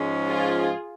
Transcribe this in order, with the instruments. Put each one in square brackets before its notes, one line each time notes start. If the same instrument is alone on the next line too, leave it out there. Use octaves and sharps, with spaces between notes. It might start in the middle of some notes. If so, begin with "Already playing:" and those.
Already playing: [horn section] G#2 F3 G#3 C#4
[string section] F4 G#4